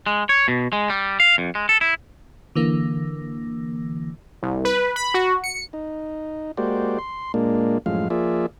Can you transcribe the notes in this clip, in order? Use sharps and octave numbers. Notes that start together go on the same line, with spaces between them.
G#3
C#5
B2
G#3
G3
F5
F2
G#3
A4
E4
D3 E3 A#3
C2
B4
B5
F#4
C#7
D#4
G#3 A#3 F#4 G4 C5 D5
C6
A#2 G#3 A#3 D4
F#2 A2 F3 G#3 F5
F3 A#3 F4 G#4 D5 E5